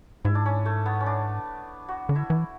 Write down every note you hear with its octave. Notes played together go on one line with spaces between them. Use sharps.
G#2 E4
D4
C#4
A3
B3
C#4
D4
F#4
D3
E4
E3